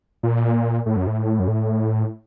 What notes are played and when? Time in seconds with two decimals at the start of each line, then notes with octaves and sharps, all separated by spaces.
0.23 A#2
0.86 A2
0.96 F#2
1.07 A2
1.39 F#2
1.48 A2